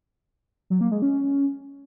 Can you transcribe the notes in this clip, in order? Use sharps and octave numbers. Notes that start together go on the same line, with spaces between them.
F#3
A#3
G#3
C#4